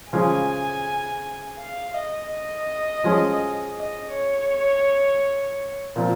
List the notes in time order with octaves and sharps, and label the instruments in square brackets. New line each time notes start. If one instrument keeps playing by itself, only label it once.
[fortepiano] C#3 F3 G#3 [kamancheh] G#5
[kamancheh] F5
D#5
D#5
[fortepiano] F3 G#3 C#4
[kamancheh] D#5
C#5
[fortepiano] A#2 F3 C4